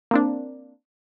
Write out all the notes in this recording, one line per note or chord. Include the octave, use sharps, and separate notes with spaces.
A#3 C4 D4